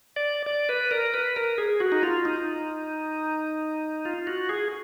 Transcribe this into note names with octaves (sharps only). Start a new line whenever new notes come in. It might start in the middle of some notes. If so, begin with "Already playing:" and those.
D5
D5
B4
A#4
B4
A#4
G#4
F#4
D#4
F4
D#4
F4
F#4
G#4